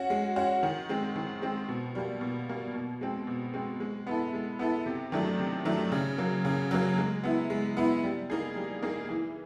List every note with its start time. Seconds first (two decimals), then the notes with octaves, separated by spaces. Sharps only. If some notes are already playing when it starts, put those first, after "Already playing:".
Already playing: C#4 F#4
0.10 G#3
0.36 C#4 F#4
0.63 D#3
0.89 G#3 C4
1.16 D#3
1.42 G#3 C4
1.68 B2
1.95 G3 A#3
2.21 B2
2.49 G3 A#3
2.74 B2
3.01 G#3 C4
3.27 B2
3.54 G#3 C4
3.80 G#3
4.07 B3 E4 A4
4.33 G#3
4.59 B3 E4 A4
4.86 C3
5.12 D#3 F#3 A3 D4
5.39 C3
5.65 D#3 F#3 A3 D4
5.92 C#3
6.18 F#3 A#3
6.45 C#3
6.71 F#3 A#3
6.98 G#3
7.23 B3 E4
7.50 G#3
7.77 B3 E4
8.03 G3
8.30 A#3 D#4 G#4
8.56 G3
8.82 A#3 D#4 G#4
9.09 E3